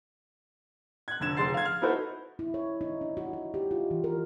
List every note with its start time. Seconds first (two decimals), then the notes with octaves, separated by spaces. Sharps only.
1.08 F#6 G#6
1.20 F1 D3 G#6 E7
1.37 F1 G#4 C6 A6 C7
1.54 F5 G#6
1.65 F6
1.81 D#4 E4 F#4 A4 B4 C5
2.39 E4
2.54 C#5
2.81 D#4
3.01 D4
3.17 F#4
3.33 F#4
3.54 G4
3.71 F4
3.91 E3
4.04 A#4